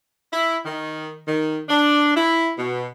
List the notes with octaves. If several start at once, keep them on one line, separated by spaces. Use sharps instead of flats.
E4
D#3
D#3
D4
E4
B2